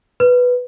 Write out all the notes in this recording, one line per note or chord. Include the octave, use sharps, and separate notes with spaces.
B4